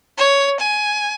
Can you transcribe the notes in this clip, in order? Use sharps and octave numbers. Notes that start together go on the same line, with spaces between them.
C#5
G#5